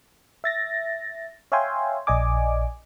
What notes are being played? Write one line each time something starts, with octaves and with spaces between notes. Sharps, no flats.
E5 A6 A#6
C#5 E5 F5 G5 G#5 C6
A#1 D5 D#5 G#5 D6